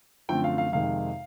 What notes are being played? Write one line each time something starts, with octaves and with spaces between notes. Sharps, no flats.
F#2 D3 F3 A3 C4 G5
F5
F5
F2 C3 D#3 G#3 F5